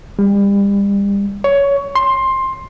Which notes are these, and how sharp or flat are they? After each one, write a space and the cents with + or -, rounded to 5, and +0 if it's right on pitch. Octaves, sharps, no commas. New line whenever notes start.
G3 +35
C#5 +15
C6 +15